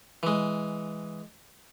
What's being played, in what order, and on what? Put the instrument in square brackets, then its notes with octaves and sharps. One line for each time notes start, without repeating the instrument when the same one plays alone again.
[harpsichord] E3 G#3